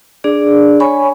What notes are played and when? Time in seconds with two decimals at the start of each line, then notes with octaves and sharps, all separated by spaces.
0.24 D4 G#4 D5
0.80 C#5 G#5 B5 C#6